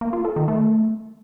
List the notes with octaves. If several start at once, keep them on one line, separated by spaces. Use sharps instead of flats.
A#3
F4
A4
D#3
A3